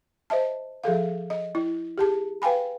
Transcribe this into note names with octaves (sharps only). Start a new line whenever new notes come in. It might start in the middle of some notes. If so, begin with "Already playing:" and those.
C5 D#5 E5 A5
F3 G#4 A4 F5
D#5
E4
G4 G#4 A5
B4 F5 G5 G#5 B5